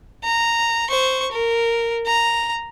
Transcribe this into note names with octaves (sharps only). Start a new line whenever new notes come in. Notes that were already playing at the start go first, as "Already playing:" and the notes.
A#5
C5 C#6
A#4
A#5